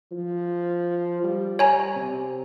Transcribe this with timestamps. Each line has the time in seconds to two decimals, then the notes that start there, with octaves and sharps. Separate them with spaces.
0.11 F3
1.23 G3
1.59 C#5 G#5 A#5
1.96 C3